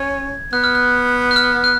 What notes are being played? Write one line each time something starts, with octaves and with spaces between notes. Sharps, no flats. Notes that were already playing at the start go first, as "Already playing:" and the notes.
Already playing: C#4 G#6
B3 F#6
F6
F#6
F#6
F6
F#6